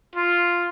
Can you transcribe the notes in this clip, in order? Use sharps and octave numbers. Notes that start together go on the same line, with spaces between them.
F4